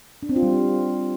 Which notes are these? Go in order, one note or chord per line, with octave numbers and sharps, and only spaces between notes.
D4
C4
F4
G3